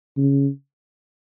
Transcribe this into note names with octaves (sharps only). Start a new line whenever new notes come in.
C#3